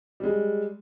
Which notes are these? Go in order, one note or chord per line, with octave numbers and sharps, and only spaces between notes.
G3 G#3